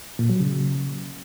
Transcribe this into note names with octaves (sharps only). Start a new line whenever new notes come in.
A#2
F#3
C#3